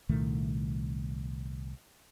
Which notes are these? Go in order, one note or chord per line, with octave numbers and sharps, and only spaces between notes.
C2 A#2 D#3 A3